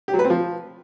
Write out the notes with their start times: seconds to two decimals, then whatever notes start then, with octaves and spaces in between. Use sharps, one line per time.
0.08 G4
0.14 F#3
0.19 B4
0.24 C4
0.30 F3